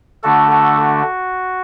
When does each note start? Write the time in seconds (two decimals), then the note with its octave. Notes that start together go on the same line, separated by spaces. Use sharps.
0.23 D3 A3 D4 F#4 A4
0.51 F#4 A4
0.80 F#4